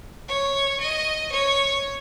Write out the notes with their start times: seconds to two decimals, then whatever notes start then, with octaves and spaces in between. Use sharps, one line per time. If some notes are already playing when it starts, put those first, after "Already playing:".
0.28 C#5
0.80 D#5
1.32 C#5